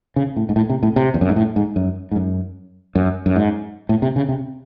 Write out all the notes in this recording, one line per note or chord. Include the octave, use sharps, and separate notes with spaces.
C#3
A2
G#2
A2
C3
A2
C3
E2
F#2
G#2
A2
G#2
F#2
G#2
F#2
F#2
F#2
G#2
A2
C3
C#3
C3